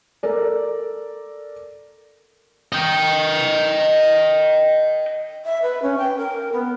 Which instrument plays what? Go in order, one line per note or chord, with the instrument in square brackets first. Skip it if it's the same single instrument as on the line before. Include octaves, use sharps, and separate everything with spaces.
[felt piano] A4 A#4 D5
[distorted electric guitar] D#5 G5
[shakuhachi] E5
B4
C#4
G5
A#4
B3